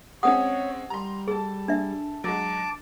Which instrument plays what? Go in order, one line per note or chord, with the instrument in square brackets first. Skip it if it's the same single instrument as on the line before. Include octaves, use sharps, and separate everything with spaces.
[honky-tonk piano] G#3 C4 C#4 [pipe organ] C#5 [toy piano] F#5 D#6
[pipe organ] G3 [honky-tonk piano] A#5 C6
[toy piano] G#4 [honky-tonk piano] A4 A5
[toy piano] D4 E5
[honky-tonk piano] F#3 G#3 [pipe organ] A5 D6